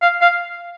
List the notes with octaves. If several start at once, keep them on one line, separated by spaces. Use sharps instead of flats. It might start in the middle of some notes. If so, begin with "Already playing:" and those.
F5
F5